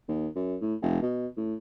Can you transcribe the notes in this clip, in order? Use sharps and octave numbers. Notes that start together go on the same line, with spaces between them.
D#2
F#2
A2
F1
B2
A2